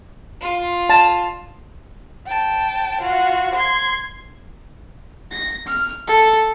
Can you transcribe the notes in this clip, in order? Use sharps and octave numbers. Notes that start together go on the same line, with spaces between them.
F4
A5
G5 A5
F4 F#4
C6 G#6
A#6
F6
A4